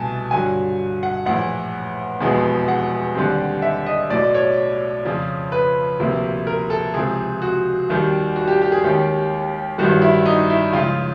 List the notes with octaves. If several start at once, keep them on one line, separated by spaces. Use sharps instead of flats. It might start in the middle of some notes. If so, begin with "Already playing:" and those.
Already playing: C2 B2 F#3 A3 G#5 A5
G2 D3 F#3 G#5
F#5
A#1 A2 E3 F#5
F1 E2 B2 G#3 B3
F#5
D#2 D3 G3 C4
E5
D#5
B1 A2 F#3 D5
C#5
F2 C#3 F3
B4
D2 C3 F3 A#3
A#4
A4
C#2 C3 F3 G#4
F#4
D#2 D#3 G3
F#4
G4
G4
G#4
D#2 D#3 G#3 C#4 G4
A1 G2 D#3 G3 F#4
E4
D#4
E4
C#2 C#3 F3 F4